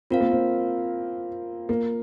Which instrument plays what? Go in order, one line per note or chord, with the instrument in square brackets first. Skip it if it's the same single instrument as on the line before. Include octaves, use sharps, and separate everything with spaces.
[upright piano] C4 [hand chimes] F4 A#4 F5
[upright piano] A#3
C4
A#3